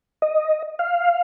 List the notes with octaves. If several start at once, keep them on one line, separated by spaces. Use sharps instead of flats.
D#5
F5